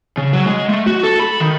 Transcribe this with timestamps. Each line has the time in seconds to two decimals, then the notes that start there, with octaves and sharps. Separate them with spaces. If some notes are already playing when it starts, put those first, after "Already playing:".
0.18 C#3
0.33 F#3
0.47 G#3
0.69 A3
0.86 F#4
1.03 A4
1.20 B5
1.40 D#3